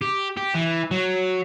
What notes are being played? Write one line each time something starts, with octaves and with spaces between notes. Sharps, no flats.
G4
G4
E3
F#3